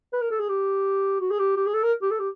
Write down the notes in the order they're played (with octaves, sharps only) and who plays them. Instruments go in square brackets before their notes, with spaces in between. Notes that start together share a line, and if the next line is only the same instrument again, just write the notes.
[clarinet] B4
A#4
A4
G#4
G4
F#4
G#4
G4
G4
G#4
A4
A#4
G4
A4
G4